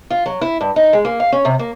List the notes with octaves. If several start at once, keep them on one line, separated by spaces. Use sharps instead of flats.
F4
F#3
E4
G2
D#4
G#3
A#3
F5
C#4
C3
A#3